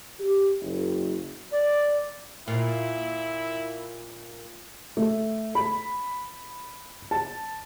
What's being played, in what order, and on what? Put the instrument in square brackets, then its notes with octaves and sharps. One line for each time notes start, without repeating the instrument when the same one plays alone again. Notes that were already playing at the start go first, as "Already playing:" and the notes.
[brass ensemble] G4
F#1
[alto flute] D5
[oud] A#2 [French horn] E4
[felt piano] A3
B5
A5